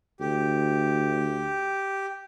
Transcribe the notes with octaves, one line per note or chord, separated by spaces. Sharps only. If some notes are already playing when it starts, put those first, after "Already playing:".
D2 G4